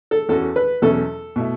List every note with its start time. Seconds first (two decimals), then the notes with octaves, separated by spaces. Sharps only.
0.11 A4
0.29 E2 E3 C#4 F#4 A4
0.56 B4
0.82 E2 B2 F#3 C#4 E4 A4
1.36 B2 A3 E4